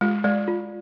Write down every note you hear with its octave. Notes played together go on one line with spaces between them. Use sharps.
G#3 F4
G#3 D5
F4